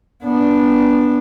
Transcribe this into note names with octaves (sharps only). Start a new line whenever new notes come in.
B3 D4